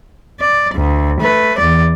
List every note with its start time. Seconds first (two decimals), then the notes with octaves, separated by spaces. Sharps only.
0.40 D5
0.74 D2
1.20 A3 B4
1.58 E2 D5